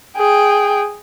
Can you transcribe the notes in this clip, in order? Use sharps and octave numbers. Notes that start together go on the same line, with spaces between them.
G#4 G5